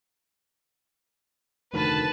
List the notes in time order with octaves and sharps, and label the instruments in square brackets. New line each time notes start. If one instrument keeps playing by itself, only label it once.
[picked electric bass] F1 D2 D#3 [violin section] B4 A5